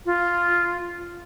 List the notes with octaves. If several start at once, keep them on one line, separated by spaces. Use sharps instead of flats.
F4